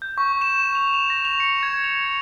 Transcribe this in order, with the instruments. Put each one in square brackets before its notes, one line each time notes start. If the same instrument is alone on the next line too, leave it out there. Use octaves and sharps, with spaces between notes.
[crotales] G6
C#6
E7
F7
F7
A#6
F7
C#7
G#6
F7
C#7